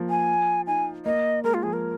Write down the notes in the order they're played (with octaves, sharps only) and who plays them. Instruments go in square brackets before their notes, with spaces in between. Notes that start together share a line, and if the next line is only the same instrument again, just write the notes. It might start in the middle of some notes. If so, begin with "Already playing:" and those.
Already playing: [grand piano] F3 A#3
[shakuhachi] G#5
[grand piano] D#4 [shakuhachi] G#5
[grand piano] A#3 [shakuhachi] D#5
[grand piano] G#3 [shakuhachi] A#4
[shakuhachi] F4
[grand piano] F3 [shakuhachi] G#4
[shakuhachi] A#4